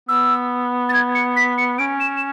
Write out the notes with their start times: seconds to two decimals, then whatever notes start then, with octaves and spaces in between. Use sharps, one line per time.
0.09 B3 E6
0.89 A6
0.93 G#6
1.15 C#7
1.36 B6
1.58 C#7
1.78 C#4 D7
2.00 E7
2.17 E7